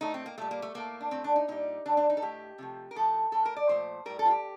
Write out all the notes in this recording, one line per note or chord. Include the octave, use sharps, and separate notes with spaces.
A2 A3 D#4
C4
A#3
A#2 G3 A3
A#3
A3
A2 A3 A#3
D4
A2 F3 A3 C4
D4
D#4
A#2 G3 D#4
D3 A3 D4
D4
D#4
A4
A2 A3 G4
C3 F3 A3
A#4
A2 F3 A3 A4
A2 A3 A4
A#4
D5
A#2 F3 A3 C5
A2 G3 A#4
A4
F4
G4